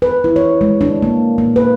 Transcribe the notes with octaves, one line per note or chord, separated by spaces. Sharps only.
B4
E4
C#5
G#3
D4
A#3
A#3
B4